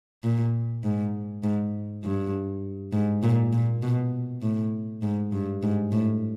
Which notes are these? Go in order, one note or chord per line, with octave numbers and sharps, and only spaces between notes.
A#2
G#2
G#2
G2
G#2
A#2
A#2
B2
A2
G#2
G2
G#2
A2